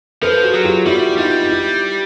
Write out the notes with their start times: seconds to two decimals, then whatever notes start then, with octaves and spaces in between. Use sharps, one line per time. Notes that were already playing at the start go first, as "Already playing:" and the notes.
0.22 F3 A4 B4
0.43 F#4 G#4
0.53 F#3
0.64 F4 G4
0.85 G3 E4 F#4
1.17 G3 D#4 F4
1.49 E4